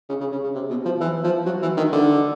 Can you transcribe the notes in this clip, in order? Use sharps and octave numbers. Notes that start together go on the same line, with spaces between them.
C#3
C#3
C#3
C#3
C3
B2
F3
E3
F3
F#3
E3
D#3
D3